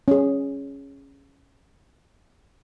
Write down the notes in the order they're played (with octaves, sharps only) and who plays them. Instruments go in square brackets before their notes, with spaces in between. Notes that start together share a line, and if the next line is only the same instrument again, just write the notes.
[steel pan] C#4 G#4